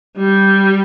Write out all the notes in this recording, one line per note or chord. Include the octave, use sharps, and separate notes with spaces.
G3